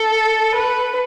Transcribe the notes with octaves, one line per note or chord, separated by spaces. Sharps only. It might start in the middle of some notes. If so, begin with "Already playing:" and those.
Already playing: A4
B4